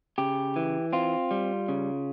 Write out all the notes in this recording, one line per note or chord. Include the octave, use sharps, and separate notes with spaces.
C#3 G4
E3
C4 F4
G3
C#3